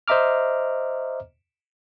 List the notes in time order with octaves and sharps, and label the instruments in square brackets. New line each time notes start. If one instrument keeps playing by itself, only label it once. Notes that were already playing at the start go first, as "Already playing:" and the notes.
[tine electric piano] C5 D#5 E5 A#5 D6 F6